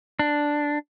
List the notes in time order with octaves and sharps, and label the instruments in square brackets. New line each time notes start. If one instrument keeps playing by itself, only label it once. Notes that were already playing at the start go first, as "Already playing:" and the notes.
[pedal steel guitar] D4